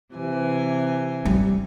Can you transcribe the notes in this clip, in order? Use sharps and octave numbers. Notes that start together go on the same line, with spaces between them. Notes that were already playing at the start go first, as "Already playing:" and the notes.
C3 E3 G#5
G3